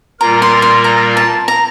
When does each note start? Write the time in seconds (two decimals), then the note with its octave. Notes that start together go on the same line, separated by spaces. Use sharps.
0.20 A#2 G3 A#3 F4 A#4 A#5
0.42 C6
0.62 C6
0.84 A#5
1.17 A5
1.48 A#5